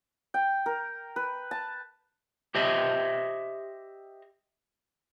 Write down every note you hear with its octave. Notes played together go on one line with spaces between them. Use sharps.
G5
A#4
B4
A5
G4 C5 D#5 E5